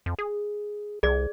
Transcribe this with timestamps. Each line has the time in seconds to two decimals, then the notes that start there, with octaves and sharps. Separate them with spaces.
0.06 F2
0.19 G#4
1.03 C2 G#4 D5